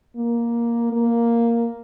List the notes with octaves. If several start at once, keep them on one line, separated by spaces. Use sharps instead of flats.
A#3
A#3